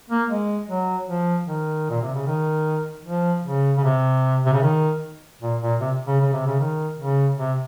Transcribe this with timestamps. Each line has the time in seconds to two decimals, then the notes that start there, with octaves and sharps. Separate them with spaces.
0.10 A#3
0.30 G#3
0.69 F#3
1.08 F3
1.48 D#3
1.90 A#2
2.02 C3
2.14 C#3
2.27 D#3
3.05 F3
3.44 C#3
3.77 C#3
3.84 C3
4.45 C3
4.53 C#3
4.62 D#3
5.41 A#2
5.61 A#2
5.80 C3
6.07 C#3
6.20 C#3
6.33 C3
6.46 C#3
6.60 D#3
6.98 C#3
7.38 C3